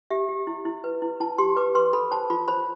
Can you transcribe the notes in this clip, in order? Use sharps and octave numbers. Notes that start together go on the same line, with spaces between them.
G4 E5
G4
E4
E4
B4
E4
E4 A5
G4 C6
B4 D6
B4 C6
A4 B5
C5 A5
F4 B5
C5 B5